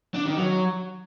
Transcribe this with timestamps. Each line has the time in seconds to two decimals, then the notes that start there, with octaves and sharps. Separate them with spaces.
0.14 D4
0.26 D#3
0.37 F#3